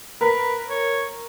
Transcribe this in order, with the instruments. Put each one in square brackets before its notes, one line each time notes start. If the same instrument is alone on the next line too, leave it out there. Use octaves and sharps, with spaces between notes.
[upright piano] A#4 [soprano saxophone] B4
[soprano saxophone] C#5